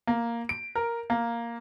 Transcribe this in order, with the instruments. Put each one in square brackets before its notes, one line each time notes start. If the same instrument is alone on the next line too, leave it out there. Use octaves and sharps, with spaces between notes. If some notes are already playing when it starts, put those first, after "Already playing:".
[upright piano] A#3
D7
A#4
A#3